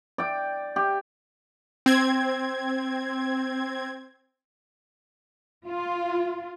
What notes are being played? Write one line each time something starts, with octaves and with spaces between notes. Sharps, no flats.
D5 G5
G4
C4 G#6
F4